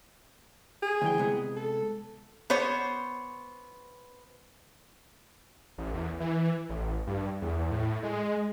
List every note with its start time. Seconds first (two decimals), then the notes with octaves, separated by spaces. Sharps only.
0.82 G#4
1.02 D2 E3 G5
1.18 C3 G#3 B3
1.56 A4
2.50 B3 C5 C#5
5.78 A1
5.94 E2
6.20 E3
6.69 A1
7.07 G2
7.42 E2
7.71 A2
8.03 G#3